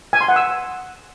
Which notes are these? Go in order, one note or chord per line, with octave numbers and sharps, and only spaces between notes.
G#5
C6
F#5
E6